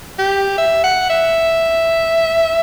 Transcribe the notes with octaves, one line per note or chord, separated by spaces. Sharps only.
G4
E5
F#5
E5